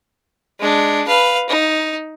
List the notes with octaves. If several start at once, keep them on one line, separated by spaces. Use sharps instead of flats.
G#3 D4
B4 F5
D#4